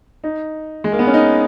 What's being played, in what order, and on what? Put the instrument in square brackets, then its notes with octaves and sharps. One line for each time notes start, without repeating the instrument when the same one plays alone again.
[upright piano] D#4
G#3
A#3
B3
C#4
D#4